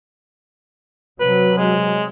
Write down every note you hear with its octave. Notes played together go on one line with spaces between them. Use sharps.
C3 F#3 B4
G#3